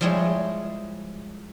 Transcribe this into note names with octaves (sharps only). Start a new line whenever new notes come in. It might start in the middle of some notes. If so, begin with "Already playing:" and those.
F3 G3 G#3 E4 G#4 C#5